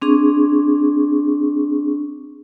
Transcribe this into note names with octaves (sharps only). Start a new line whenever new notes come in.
C4 D4 G#4 C#6